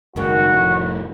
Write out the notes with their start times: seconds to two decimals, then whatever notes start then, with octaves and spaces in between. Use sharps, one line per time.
0.16 F#1 G#2 D#3 G3 C#4 F#4
0.53 F1 A2